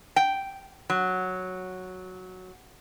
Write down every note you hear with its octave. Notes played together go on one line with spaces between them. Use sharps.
G5
F#3